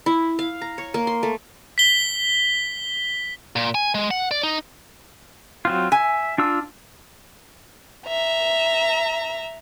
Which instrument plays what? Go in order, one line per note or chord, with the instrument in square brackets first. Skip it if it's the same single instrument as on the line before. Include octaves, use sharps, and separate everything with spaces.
[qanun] E4
F5
A#5
C#5
A#3
C6
A3
[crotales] B6 G7
[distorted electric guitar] A#2
G#5
G#3
F#5
D5
D#4
[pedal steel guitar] F#3 C4 F4
[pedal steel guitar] E5 [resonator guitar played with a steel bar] G#5
[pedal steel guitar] D4 F4 E6
[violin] E5 A#5